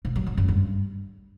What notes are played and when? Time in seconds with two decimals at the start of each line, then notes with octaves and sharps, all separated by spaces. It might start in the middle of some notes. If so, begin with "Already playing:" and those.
0.05 B2
0.16 F#3
0.27 D3
0.37 F#2
0.48 G2